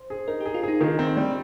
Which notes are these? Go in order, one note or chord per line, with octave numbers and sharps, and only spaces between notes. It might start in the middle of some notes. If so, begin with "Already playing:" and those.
Already playing: C5
G#4
D#4 A#4
G4
G#4
F4
D#4 G#4
D#3 F4
C4
G3